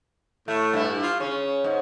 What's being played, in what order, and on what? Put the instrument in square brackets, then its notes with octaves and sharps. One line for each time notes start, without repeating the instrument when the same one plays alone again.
[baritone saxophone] A2 [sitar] A3
[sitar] G2 E4
[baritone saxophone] F4
[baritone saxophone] C#3 [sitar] C#4
[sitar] G#2